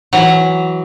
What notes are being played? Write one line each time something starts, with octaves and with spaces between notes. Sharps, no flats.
E3 F#3